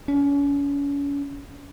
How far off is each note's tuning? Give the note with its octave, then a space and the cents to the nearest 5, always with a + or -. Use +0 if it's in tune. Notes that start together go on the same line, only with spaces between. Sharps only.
C#4 +35